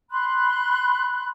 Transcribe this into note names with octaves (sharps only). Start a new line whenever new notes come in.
B5 C6 F#6